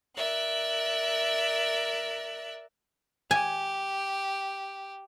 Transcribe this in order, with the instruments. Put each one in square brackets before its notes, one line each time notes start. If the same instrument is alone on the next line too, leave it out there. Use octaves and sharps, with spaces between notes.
[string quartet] A#4 D5 E5 F#6
[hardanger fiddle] G4 [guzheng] G#5